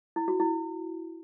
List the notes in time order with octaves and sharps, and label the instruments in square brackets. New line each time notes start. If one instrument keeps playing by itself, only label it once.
[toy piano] E4
F#4
E4